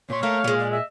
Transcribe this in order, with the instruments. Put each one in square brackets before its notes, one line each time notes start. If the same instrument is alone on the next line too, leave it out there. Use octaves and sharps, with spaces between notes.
[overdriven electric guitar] A#2 C6 [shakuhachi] C#5
[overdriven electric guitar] A3 [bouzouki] A#3 [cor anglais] F5
[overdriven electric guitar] A#2 [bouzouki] F#3 G#3
[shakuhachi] D5
[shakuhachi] D#5 [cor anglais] E5